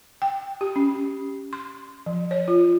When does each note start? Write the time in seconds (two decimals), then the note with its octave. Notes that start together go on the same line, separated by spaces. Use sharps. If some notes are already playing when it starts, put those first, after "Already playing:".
0.22 G5
0.61 G4
0.76 C#4
1.53 C6
2.06 F3
2.31 C#5
2.48 F4